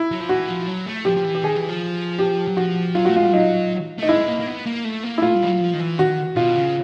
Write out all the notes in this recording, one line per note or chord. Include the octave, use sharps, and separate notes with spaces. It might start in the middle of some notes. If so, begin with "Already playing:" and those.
Already playing: E4
F#3
F3
E3 F#4
F3
F#3
A3
F3 G4
F3
E3
G4
D#3 G#4
E3
F3
G4
F#3
F3 F#4
F#3 F4
A3 F#4
G#3 F4
G3
F#3 D#4
A3 D#4
G#3 E4
A#3
A#3
B3
A#3
A3
A#3
E4
A3 F4
G3
F3
F#3
F3
D#3
E3
D#3 F#4
B2 F4
C#3